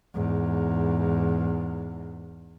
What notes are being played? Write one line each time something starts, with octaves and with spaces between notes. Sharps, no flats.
E2 G#2